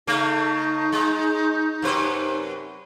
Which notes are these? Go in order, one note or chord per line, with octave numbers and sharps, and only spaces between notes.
C#3 A3 D#4
G#3
F#2 C3 B4